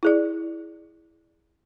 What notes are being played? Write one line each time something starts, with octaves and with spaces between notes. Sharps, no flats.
E4 G#4 D5